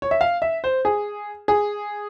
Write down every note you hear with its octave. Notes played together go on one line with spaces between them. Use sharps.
C#5
E5
F5
E5
C5
G#4
G#4